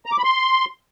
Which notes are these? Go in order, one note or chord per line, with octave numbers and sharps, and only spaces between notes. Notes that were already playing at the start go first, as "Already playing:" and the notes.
A#5
D6
B5
C6